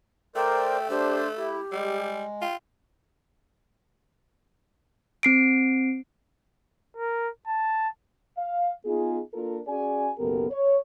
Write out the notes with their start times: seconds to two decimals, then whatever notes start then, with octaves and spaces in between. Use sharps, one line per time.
0.36 A3 A#4 C5 D5 G5
0.90 D4 G4 C5
1.37 E4 G4
1.72 G3 G#3
2.41 F4 G5
5.23 C4 C7 D7
6.97 A#4
7.47 A5
8.38 F5
8.85 B3 D#4 F4 G#4
9.34 A#3 D4 F4 A4 A#4
9.67 C#4 F#4 G#4 D5 G#5
10.18 F#1 B1 B3 G4 A4 A#4
10.50 C#5